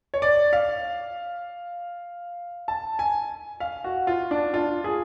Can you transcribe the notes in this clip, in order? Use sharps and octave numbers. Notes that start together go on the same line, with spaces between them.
C#5
D5
F5
A5
G#5
F5
F#4
F4
D4
F4
G#4